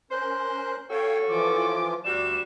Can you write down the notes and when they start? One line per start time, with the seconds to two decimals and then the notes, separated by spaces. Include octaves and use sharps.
0.11 C#4 A#4 C5 F#6
0.90 C#4 F#4 A4 C#5 F5 G5
1.29 E3 F3 F4 D6
2.05 D2 G3 D4 F#4 E7